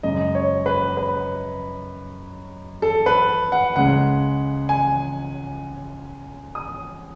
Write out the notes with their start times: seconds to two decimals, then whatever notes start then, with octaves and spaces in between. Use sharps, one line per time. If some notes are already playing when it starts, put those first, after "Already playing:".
0.03 F#2 C#3 G#3 D#5
0.35 C#5
0.66 B4
0.97 B4
2.82 A4
3.06 B4
3.52 F#5
3.76 C#2 C#3 G#3 F#5
4.69 G#5
6.55 D#6